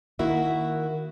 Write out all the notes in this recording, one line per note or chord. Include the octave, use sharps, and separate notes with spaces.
D#3 A#3 E4 F#4 E5